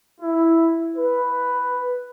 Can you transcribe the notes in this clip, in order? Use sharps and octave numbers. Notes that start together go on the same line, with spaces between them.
E4
B4